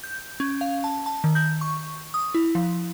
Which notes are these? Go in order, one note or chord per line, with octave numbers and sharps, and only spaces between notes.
G6
C#4
F5
A5
A5
D#3
G6
C#6
D#6
E4
F3